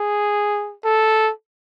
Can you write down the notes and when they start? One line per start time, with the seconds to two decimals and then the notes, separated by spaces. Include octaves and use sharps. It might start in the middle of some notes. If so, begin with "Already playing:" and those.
Already playing: G#4
0.85 A4